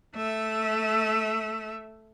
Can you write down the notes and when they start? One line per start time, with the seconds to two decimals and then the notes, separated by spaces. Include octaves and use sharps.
0.15 A3 E5